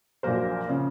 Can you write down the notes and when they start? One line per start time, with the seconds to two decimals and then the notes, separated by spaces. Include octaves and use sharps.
0.23 A#1 A#2 F#3 A#3 A#4 C5
0.69 C#3 F3